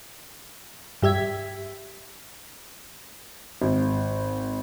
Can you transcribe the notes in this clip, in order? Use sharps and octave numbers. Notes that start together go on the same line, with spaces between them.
G2 G4 E5 G#6 B6
G#1